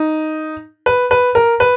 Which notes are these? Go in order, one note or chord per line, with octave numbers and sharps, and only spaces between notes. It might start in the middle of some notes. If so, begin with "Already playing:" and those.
Already playing: D#4
B4
B4
A#4
B4